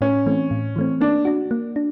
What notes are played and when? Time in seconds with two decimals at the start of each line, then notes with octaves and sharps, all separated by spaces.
0.01 A2 C#4
0.26 E3 A3 C4
0.51 A2
0.76 E3 A3 C4
1.01 A#3 D4
1.25 D4 F#4
1.51 A#3
1.76 D4